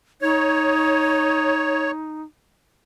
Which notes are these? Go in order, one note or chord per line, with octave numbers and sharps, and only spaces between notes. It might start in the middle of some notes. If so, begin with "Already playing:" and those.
D#4 C#5